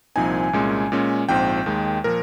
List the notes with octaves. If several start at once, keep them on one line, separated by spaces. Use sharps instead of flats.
C2 A#2 F3 C4 D#4 G#5
C2 A#2 G#3 C#4
A#2 G#3 C#4
A#1 G#2 F3 C4 G5
D#2 D#3 G#3
A#2 F3 A#4